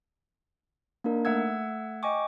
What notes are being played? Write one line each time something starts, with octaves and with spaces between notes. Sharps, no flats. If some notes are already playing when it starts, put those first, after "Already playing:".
A#3 D4 D#4 A#4
A3 E5 F#5 E6 G#6
D#5 G5 G#5 C#6 D6